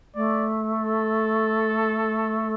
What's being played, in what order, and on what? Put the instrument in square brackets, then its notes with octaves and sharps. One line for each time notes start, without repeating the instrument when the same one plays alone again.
[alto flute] A3 [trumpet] D5
[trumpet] A4